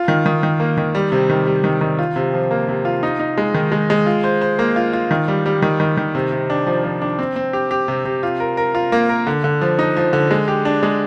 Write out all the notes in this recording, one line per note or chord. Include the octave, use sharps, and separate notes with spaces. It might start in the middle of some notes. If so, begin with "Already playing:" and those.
Already playing: F4
D#3
D#3
D#3
A#3
D#3
G3
C3
D#3
G3
D#3
D#3
F4
C3
F3
A#3
C3
F4
D#4
D#4
G#3
D#3
G#3
G#3
F4
C5
C5
A#3
F4
F4
D#3
G3
G3
D#3
D#3
D#3
C3
C3
D4
F3
F3
D4
C4
C4
G4
G4
C3
C3
F4
A#4
A#4
F4
A#3
A#4
D3
D3
F3
D#4
F3
D3
G#3
G4
D4
G#3